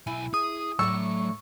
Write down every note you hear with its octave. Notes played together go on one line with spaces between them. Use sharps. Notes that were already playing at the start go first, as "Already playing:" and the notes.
B1 E4 G#5
G#4 D#6
A2 F#3 A3 D4 C#6 E6